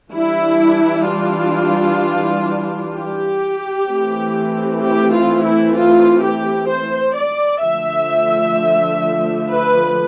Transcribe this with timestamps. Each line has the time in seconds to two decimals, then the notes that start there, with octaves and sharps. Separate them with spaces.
0.12 E3 G3 D4 E4
1.06 F4
2.94 G4
3.87 E3 A3 C4
4.82 G4
5.13 F4
5.44 E4
5.76 F4
6.22 G4
6.68 C5
7.15 D5
7.62 D3 F3 A3 E5
9.49 B4